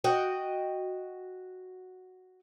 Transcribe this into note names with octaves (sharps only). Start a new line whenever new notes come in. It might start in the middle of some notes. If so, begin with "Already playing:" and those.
F#4 D#5 F#5 G5